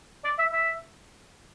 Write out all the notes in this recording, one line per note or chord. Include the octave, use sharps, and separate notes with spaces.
D5
E5
E5